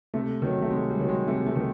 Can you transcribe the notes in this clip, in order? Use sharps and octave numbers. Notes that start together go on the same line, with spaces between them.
C3 A3
D#3 F#3
A3
C3 G#3
G3
D#3 F#3
G#3
C3 A3
A3
D#3